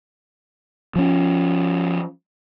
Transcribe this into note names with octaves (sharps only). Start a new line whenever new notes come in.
F3 C#4